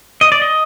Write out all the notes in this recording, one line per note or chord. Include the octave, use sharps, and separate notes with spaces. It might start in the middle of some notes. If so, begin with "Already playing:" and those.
D#5
D5
D#5